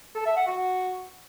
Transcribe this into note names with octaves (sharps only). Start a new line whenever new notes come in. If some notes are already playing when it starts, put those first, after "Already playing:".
A4
E5
F#5
F#4